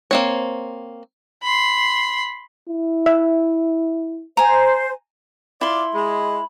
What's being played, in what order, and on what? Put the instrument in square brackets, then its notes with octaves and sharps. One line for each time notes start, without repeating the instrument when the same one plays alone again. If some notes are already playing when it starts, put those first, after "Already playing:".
[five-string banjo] A#3 C4 C#5
[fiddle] B5 C6
[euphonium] E4
[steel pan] E5
[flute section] C5 [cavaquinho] G#5 A#5
[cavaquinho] E4 C6 [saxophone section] F4 D5
[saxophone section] G#3 [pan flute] B5